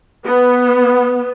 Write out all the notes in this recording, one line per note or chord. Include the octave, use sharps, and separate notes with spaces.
B3